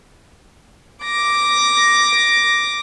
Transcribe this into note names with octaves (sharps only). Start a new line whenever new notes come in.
D6 A#6